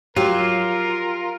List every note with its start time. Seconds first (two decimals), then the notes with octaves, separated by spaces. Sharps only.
0.16 F#3 F4 G4 A#4